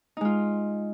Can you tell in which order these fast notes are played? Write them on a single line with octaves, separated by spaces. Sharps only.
D#4 G#3 F4